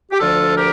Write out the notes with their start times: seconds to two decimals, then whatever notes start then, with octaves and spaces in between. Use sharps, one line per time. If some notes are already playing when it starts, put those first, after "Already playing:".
0.11 G4
0.20 D2 D3 F3 F4 A4
0.56 G4 A#4